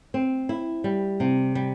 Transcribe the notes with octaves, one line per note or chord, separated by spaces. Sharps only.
C4
E4
G3
C3
G3